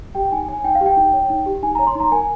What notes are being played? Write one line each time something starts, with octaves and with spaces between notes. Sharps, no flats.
G4 G5
D#4 G#5
C#5 G#5
D#4 G5
F5
G4
G5
D#4
C#5
D#4
G4
D#4 G#5
A#5
C#5
C6
D#4 A#5
A#4 G#5